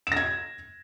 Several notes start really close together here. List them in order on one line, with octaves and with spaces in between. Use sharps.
E7 A#6 G#6